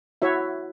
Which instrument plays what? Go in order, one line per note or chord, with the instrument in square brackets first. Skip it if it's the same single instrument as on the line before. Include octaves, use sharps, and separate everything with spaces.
[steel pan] E4 F#4 C#5 E5